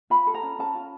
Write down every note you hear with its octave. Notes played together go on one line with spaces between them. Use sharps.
F4 B5
A4
A#5
C#4
C#4 A5
F4